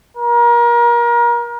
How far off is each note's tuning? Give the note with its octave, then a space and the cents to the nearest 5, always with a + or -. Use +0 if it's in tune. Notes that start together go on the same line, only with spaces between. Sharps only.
A#4 +30